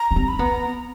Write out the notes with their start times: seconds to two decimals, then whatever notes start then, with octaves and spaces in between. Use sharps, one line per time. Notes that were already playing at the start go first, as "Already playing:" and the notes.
Already playing: A#5
0.11 C#4
0.16 C4
0.28 B5
0.39 B3 A#5